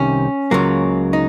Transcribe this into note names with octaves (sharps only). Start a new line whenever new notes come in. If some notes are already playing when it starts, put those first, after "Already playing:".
Already playing: C2 C3 D#3 C#4
C#2 C#3 F#3 A#3
D#4